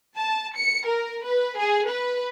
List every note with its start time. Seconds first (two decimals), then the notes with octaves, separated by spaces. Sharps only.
0.18 A5
0.58 C#7
0.88 A#4
1.25 B4
1.58 G#4
1.90 B4